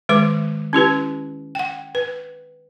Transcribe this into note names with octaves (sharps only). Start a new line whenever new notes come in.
D#3 G#3 B4 D6
C#4 E4 G4 B4
F#5 G5
B4